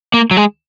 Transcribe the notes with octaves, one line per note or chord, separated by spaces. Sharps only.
A#3
F#3
G#3